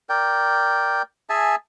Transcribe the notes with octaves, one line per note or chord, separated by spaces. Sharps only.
A#4 D5 G5
G#4 E5 G#5 A5